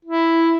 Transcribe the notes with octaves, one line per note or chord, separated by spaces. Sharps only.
E4